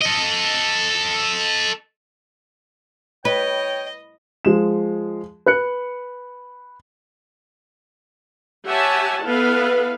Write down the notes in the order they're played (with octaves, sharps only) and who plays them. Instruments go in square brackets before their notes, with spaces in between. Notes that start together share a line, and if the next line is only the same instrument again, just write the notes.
[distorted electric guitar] A4 D#5
[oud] B4 [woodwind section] C#5 G5 [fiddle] D#5
[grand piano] F3 G#3 E7
B4 F#6 C#7
[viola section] G4 C#5 E5 F#5 G#5 A5
B3 E4 A4 B4 F5